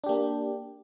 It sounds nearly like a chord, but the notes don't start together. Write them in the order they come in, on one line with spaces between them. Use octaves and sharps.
D4 G4 A#3